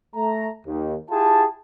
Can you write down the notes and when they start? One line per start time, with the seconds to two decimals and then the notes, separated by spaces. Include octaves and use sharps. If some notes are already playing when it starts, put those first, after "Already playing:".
0.15 A3 A#5
0.66 D#2
1.10 E4 F4 G4 G#4 G5 A5